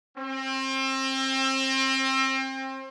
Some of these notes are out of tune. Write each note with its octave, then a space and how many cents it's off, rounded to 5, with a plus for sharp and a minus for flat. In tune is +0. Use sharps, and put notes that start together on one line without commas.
C4 +30